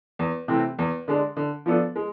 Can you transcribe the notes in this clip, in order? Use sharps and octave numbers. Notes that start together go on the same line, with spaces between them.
E2
C3 E3 A3 C4
E2
D3 G#3 D4
D3
F3 B3 D4 A4
G#3